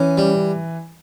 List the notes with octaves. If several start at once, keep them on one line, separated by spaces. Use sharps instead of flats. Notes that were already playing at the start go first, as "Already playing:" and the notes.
Already playing: E3 C#4
G3